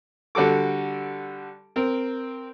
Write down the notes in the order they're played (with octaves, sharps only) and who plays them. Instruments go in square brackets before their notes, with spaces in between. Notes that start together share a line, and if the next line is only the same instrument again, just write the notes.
[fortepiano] D3 G3 F#4 A4 D6
C4 A#4